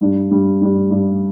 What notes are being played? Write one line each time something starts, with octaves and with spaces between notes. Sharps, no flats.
G2 G3 D4
G2 G3 D4
G2 G3 D4
G2 G3 D4